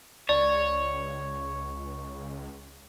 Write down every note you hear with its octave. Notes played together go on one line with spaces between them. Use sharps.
C#2 C#5 D5